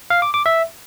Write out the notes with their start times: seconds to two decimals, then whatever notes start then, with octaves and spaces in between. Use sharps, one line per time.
0.10 F5
0.22 D6
0.34 D6
0.46 E5